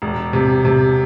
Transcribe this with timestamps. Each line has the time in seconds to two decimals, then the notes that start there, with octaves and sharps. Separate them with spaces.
0.02 E1
0.33 C3
0.65 C3